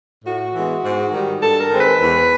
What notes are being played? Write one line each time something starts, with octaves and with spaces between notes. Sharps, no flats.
A2 F#4
E3 G#3 B3
G#2
D#3 G3
G2 A4
A#4
D#3 G#3 C4
B4
E2